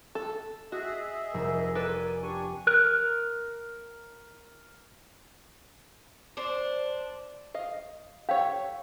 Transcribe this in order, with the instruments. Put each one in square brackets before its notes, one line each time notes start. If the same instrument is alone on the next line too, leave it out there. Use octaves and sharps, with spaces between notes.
[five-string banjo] A4
[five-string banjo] F#4 [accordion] G#4 D#5 E5
[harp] F1 E6 [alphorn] A#4
[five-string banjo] A4 B4 [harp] D5 [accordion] G#5
[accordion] D4 G#5 C#6 [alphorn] G4
[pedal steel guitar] A#4 F#6
[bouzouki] D4 C5
[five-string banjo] D#5 F5
[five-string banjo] G4 A4 C#5 [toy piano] F5